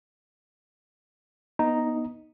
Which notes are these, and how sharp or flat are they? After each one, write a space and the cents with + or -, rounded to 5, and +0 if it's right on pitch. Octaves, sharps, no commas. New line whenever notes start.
B3 -20 D#4 +0 A#5 +0